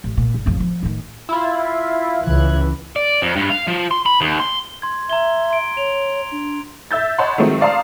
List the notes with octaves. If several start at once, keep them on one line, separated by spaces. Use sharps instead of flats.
A1
A#2
G#1
A1 F2
F3
A2 D#3
E4 F4
C#2 E3 F#6 G#6
D5
F2
G2
F5
F3
C6
B5
D#2
C6
C6 G#6
E5 A#5 G#6 G7
C6 D7
C#5 F7
D4
E5 E6 G6 A6
C#5 D#5 F#5 A5 B5 C6
D#3 F3 F#3 G#3 A3 C4
D5 F5 A5 A#5 C6 D#6